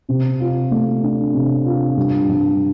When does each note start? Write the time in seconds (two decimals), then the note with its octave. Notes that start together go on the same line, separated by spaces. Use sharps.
0.09 C3
0.40 F4
0.71 A3
1.03 D4
1.34 C3
1.65 F4
1.97 G2
2.28 G2